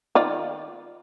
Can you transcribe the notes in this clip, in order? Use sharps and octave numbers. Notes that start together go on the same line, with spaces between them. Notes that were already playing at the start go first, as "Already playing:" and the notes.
D#3 F4 D5